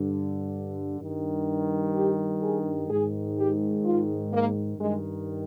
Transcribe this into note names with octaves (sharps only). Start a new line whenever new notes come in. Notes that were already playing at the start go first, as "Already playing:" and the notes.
Already playing: G2 D3
G2 D#3
G4
G#4
G#2 D#3 G#4
G4
F4
A#3
G2 D#3 G#3